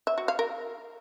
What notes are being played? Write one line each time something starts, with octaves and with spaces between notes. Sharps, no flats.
E5
F#4
F5
A#4